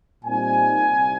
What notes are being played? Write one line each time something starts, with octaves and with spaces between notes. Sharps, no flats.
A#2 G3 C4 D#4 G#5
C2